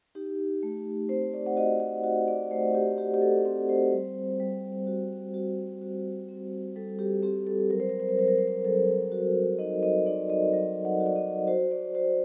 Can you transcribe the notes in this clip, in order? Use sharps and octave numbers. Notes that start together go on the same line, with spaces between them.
D#4 G4
A3
C4 C5
D5
F#5
F#4 D#5
F#5
F#4 F#5
D5
A3 C5
G4
F#4 G4
G4
A4
C4
C5
G3
G3
F#4
F#4
F#4
C4
G3 A4
G4
C4 G4
A4
F#3 A#4
C5
A#4
C5
A#4
F#3 C5
A#4
C5
A#4
F#3 A4
F#4
D#4 D#5
D#5
D#4 D5
D#5
F#3 D#5
F#5
F#4
D5
D#5
F#4 C5
D5
F#4 C5